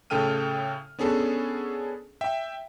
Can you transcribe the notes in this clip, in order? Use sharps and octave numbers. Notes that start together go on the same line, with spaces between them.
A2 C#3 A4 G5 F6 D#7
B3 C#4 D4 G#4 A4
E5 G5